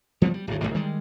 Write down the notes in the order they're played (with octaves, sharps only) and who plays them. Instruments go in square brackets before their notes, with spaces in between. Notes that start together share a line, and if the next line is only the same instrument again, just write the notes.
[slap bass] F3 G3 A3 B3
G3
D1 G#1 G2
F#1 C#2 A2 G3
D#3 G3 G#3